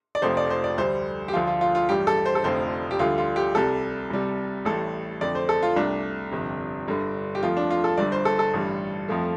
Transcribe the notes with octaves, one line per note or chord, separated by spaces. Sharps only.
D5
F1 F2 F3 A3 C5
D5
C5
D5
D2 D3 G3 C5
G4
D2 D3 F3 F4
F4
F4
F4
A1 G2 G3 G4
A4
C5
A4
F1 F2 D3 F3 A3 C5
G4
D2 D3 G3 F4
F4
G4
C2 C3 G3 A4
C2 C3 G3
A1 A2 G3 A4
F2 D3 A3 D5
C5
A4
F4
C2 C3 A3 D4
G1 F2 C3
G1 G2 D3
G4
F2 F3 A3 F4
D4
F4
A4
G1 G2 G3 D5
C5
A4
A4
A1 G2 D3 G3
F2 F3 A3